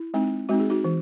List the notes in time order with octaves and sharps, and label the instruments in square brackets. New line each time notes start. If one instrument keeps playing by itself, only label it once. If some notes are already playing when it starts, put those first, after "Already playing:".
Already playing: [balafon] E4
G#3 C4 D#4
G#3 C4 D#4 F#4
G#4
D#4 F#4
E3